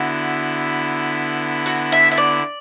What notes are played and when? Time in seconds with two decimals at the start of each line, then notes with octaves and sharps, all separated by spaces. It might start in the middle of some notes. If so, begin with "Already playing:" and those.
Already playing: D3 B3 E4 F#4
1.66 F#4
1.92 E5
2.12 E5
2.18 D5